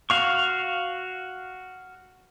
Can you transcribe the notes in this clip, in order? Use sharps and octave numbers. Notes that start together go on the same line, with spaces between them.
F#4 F5 C#6